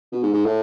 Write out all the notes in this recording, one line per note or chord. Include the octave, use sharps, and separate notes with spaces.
B2
G#2
G#2
A2